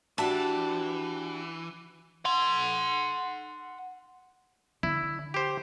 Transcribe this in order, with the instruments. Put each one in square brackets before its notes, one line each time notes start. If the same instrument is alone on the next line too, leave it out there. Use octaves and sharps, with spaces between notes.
[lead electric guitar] E3 [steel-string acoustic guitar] D4 F#4 G4 [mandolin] E5 A5
[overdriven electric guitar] F#5 C6
[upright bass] D3 [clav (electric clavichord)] E4
[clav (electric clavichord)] G4 C5